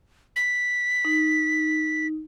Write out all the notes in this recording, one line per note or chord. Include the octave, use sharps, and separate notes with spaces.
B6
D#4